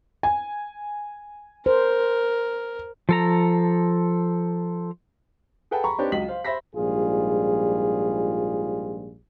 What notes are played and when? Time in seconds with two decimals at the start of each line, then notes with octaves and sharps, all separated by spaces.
0.23 G#5
1.66 A#4 C5
3.09 F3 A4 A#5
5.71 G#4 A4 B4 F#5 G5 A5
5.84 A#5 B5 C#6
5.98 C4 D4 D#4 G4 B4 C#5
6.12 C#2 F#3 D#5 B6 F#7
6.28 C5 F5
6.44 C5 E5 B5 A#6 B6
6.75 A#1 G#2 G3 F4 G#4